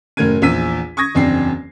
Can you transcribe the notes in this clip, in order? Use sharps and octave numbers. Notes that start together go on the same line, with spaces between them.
F#1 A2 A#4 G#6 D#7
A#1 E2 E6 B6 D#7
C#6 D#6 G#6 A#6
F#1 E2 C4 D4 C7